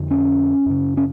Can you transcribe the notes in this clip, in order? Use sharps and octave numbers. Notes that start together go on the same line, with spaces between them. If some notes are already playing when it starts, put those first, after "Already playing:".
Already playing: F2 D3
C#4
F#2 C#3
C#4